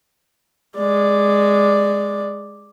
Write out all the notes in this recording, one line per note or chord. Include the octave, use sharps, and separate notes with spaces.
G#3 D5